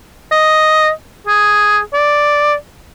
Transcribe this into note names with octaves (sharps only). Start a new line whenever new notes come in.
D#5
G#4
D5